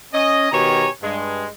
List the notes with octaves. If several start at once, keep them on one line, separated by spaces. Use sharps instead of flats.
C#4 D#5
B2 D#3 G4 C#5 G#5 A#5
G2 G#3